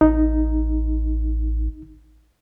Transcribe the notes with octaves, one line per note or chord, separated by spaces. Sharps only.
A1 D#4